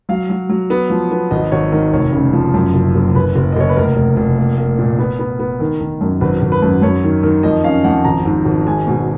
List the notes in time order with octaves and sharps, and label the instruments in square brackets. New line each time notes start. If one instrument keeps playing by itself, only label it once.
[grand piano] F#3 F5
F#3
F#3
B3
F3
B3
G#1 D#5
G#1 C#5
D#3 D#5
F1 C#5
C#3
F3
F#2
F#1
F#1
F#1 B4
F#1
D#5
F#1 C#5
B4
F1 A#4
F1
F1
A#3
A#3
A#2
B3
B3
B3
D#3
D#3
F#2
G#1 B4
G#1
B4
F#2
F#2 C#5
D#3
D#3
F2 D#5
C#4 F5
F2 F#5
G#1 A#5
G#2
G#1
G#3 G#5
B2